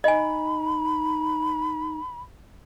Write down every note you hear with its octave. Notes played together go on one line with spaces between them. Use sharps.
D#4 D#5 G#5 B5